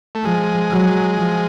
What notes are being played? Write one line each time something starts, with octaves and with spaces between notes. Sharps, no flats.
A3
F3 G#3
F#3
F3